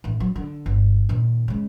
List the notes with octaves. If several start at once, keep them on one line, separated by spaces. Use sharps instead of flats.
A1 E3
F#3
D3
G1
A#2 D#3
C#3 G#3